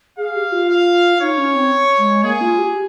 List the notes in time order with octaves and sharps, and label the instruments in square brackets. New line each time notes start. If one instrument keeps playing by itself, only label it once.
[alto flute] G#4 [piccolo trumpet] F5
[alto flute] G4
F4
[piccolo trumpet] F5
[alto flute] D#4 [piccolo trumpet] C#5
[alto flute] C#4
C4
G#3
[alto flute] A#3 [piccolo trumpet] G#4
[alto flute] F4
G4